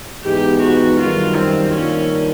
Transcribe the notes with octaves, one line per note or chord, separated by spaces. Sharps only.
G#2 E3 G#3 B3 D#4 G4
F#4
F#2 D#3 G3 F4
C4
D#3 G3 A#3 C#4 D4 F4